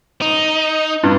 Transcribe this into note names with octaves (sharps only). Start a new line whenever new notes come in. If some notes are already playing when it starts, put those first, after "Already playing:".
D#4
G2